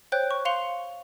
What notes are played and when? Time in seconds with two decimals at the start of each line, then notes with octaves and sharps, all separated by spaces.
0.12 C5 C#5 G5 F#6 G6
0.31 C#6
0.45 F5 C6 C#7 F7 G7